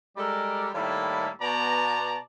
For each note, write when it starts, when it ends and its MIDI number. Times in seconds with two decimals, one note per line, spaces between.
0.17 0.68 55
0.17 0.68 56
0.17 0.68 69
0.17 0.68 70
0.17 0.68 74
0.75 1.30 45
0.75 1.30 51
0.75 1.30 55
0.75 1.30 58
0.75 1.30 64
0.75 1.30 69
1.41 2.17 47
1.41 2.17 59
1.41 2.17 74
1.41 2.17 81
1.41 2.17 82